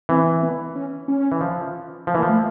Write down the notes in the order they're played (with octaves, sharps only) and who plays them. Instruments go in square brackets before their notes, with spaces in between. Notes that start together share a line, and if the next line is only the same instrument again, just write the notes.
[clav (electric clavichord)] E3 [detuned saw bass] C4
[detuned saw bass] B3
C#4
C#4
[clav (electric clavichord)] E3
F3
F3
E3
[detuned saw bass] A#3
[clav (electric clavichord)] F3
[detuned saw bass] A3